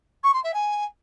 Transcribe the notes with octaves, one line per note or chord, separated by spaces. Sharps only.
C#6
C6
E5
G#5